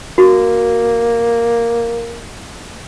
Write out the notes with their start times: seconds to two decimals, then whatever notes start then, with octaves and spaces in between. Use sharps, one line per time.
0.18 A#3 F#4